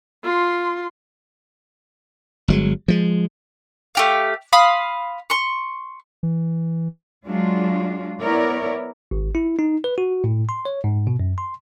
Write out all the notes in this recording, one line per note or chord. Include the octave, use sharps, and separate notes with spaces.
F4 C6
G1 F#3 G#3
F3 G#3
A3 G4 F5
F5 B5 C6 D#6
C6 C#6
E3
F#3 G#3 D4 F4
B3 E4 A#4 C#5 D5
G#1
E4
D#4
B4
F#4
A2
C6
C#5
G#2
B2
F#2
C6